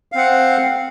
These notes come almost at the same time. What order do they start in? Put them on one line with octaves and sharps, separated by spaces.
F5 C4 F#5